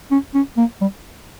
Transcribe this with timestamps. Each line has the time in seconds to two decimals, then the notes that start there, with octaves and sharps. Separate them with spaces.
0.11 C#4
0.34 C#4
0.57 A#3
0.81 G3